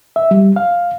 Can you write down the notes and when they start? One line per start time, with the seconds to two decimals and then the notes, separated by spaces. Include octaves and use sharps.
0.16 E5
0.31 G3
0.56 F5